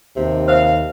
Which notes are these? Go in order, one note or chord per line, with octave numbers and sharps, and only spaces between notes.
D#2 C3
C5 E5 F5